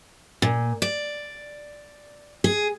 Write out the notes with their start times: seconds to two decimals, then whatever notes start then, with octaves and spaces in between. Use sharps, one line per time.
0.42 A#2
0.82 D5
2.44 G#4